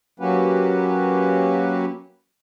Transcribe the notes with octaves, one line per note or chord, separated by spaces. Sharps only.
F#3 A#3 C#4 F#4 G4 B4